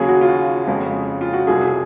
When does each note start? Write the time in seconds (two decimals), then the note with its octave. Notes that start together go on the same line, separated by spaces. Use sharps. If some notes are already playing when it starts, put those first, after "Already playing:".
Already playing: D#2 C#3 F#3 G#4
0.08 F#4
0.21 F4
0.28 F#4
0.67 F2 C#3 G#3
1.21 F4
1.33 F#4
1.47 C2 C3 F#3 G#4